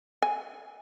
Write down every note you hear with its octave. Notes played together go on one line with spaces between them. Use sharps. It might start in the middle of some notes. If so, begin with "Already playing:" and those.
G#5